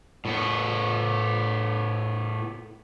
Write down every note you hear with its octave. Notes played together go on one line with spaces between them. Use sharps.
A2 B3